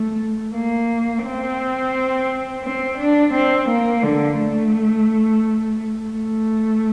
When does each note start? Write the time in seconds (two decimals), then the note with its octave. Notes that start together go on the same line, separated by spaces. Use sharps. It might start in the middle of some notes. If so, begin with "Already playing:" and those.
Already playing: A3
0.54 A#3
1.24 C4
2.63 C4
2.98 D4
3.34 C4
3.69 A#3
4.03 D3
4.38 A3
6.13 A3